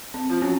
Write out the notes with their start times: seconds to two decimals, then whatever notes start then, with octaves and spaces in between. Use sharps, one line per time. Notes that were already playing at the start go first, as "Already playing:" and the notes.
0.14 C4
0.30 F3
0.42 F#3 C#4